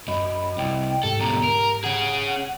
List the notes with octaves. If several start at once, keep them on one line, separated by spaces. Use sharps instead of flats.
F#2 D#5 B5
C2 G5
G#2 G4 A4
D2 B2 A#5
A#4
C#4 G#4 F#5